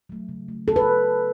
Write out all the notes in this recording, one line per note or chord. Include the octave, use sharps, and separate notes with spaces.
F#3 A3
C#3
A3
C#3 A4
B4